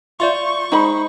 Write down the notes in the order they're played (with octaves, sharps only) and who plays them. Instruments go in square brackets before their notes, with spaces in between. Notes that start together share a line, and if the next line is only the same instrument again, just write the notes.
[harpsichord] F4 [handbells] D5 E5 C6 [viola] C#6
[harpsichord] G#3 [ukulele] D#4 C5 B5